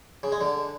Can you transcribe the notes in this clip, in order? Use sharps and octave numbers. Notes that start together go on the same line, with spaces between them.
C#3
G#3
D3